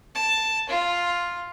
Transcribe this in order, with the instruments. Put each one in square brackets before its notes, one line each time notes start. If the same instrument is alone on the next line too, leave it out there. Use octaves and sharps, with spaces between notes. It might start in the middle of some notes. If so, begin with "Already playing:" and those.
[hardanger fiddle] A5
F4